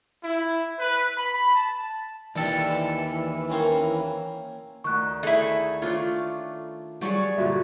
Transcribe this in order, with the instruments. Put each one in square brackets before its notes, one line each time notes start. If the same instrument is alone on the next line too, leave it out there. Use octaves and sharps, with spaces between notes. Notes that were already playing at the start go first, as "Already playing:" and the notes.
[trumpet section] E4
B4
B5
A5
[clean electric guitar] D#2 A4 [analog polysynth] E3 [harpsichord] D4 G4
[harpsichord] A#3 C4 C#4
[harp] D2 D#3 [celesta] C#6 F#6
[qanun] A3 G#4 A4 [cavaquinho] D#4 E4
[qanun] A3 D4 F4 [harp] C#5
[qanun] F#3 G#4 C#5 [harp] G3 D5 C#6
[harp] G2 A#2 D3 [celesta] F#4 E5